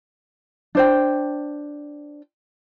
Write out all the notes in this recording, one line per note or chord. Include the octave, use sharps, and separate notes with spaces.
D4 C5 G5